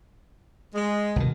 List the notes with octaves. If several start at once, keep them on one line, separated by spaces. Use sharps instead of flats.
G#3
C2 B2 D#3